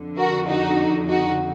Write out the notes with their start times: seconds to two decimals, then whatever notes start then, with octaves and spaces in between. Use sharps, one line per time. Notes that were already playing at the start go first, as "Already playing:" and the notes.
Already playing: F2 D3
0.18 F#4 A#4
0.48 D#4 F#4
1.08 D#4 F#4